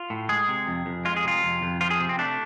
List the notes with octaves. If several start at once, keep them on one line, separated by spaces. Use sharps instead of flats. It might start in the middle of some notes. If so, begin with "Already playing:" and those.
Already playing: F4
A2
G#3 G#4
C3
F2
F2
G#3 F4
G#4
C3 F4
F2
F2
F3 F4
G#4
C3
C4
A3 D4